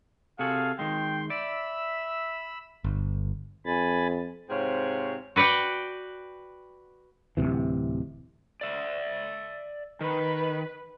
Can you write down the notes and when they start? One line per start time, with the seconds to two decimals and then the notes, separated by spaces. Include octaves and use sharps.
0.39 C3 F#4 G#4 A4 F5
0.79 D#3 G#3 G5 C6
1.30 D5 E5 B5 E6
2.84 G1
3.66 F2 G#5 B5 A6
4.49 G#2 C3 C4 F4 G#4 C#5
5.36 F#4 B4 D5 F#5 G5
7.37 D1 B1 C3 E3
8.61 D5 E5
10.01 D#3 B4